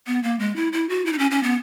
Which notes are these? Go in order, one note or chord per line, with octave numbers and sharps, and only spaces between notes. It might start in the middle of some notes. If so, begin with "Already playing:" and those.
B3
A#3
G#3
E4
E4
F#4
E4
D#4
C#4
C#4
B3